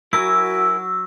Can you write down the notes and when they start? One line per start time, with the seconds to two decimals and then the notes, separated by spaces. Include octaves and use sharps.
0.13 F#3 E4 F#4 A#4 G#5 E6